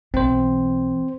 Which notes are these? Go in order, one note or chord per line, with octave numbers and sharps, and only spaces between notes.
B1 E3 C4 C5